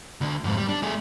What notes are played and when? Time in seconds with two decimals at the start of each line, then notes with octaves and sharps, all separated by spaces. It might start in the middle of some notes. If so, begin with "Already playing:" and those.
0.21 D2 D3
0.44 F2 G#2
0.57 G3
0.68 D4
0.83 A3 G#4